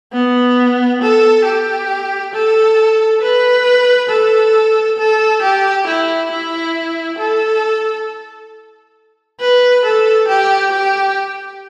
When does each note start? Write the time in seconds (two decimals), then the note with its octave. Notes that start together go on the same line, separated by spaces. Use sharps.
0.13 B3
1.02 A4
1.45 G4
2.34 A4
3.22 B4
4.10 A4
4.99 A4
5.43 G4
5.87 E4
6.32 E4
7.19 A4
9.41 B4
9.85 A4
10.29 G4
10.72 G4